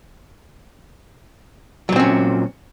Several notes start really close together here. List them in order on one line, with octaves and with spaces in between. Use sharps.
F#3 A#2 C4 C#4